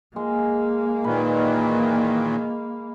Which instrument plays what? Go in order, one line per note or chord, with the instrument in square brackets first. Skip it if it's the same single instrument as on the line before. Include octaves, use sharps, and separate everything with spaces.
[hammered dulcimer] G#3 [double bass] A#3
[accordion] A#2 D#3 E3 [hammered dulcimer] B4